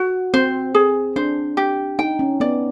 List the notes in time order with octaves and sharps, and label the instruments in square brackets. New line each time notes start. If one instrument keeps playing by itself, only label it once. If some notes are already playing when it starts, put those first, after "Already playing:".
Already playing: [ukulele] F#4
[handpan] C4 [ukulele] C5
[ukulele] G#4
[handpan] D4 [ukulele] C5
[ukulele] G4
[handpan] D#4 [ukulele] G5
[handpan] C#4
[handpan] B3 [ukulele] D5